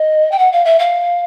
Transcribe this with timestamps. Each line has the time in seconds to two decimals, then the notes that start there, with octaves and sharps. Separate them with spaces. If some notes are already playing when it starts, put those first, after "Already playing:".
Already playing: D#5
0.31 G5
0.38 F#5
0.52 F5
0.65 E5
0.79 F5